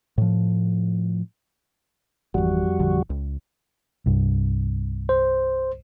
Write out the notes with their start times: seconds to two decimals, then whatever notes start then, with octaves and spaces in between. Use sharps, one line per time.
0.18 A2 F3
2.34 G#1 F2 E3 G3 F#4
2.79 A1 D3 F3
3.10 C#2
4.06 C2 G2
5.09 C5